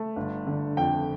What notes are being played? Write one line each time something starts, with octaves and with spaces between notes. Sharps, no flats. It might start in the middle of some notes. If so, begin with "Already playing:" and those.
Already playing: A3
G1
D3
F2 G5